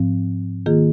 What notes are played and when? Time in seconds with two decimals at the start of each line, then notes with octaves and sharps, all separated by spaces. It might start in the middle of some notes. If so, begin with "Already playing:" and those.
Already playing: G#2 F3 C4
0.66 D#3 A#3 F4 G#4